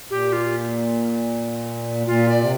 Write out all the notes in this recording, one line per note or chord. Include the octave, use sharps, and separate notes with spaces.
A#2 G4
F4
A#2 F4
D5
C3